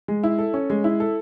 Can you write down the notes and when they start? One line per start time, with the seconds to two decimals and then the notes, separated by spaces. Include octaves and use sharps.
0.08 G#3
0.23 E4
0.39 A4
0.54 C#4
0.70 G#3
0.84 E4
1.00 A4